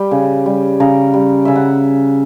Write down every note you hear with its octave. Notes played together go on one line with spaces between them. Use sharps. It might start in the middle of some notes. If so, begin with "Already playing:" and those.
Already playing: G3 G5
C#3
G3
C#3 A#5
G3
C#3 E5
F#5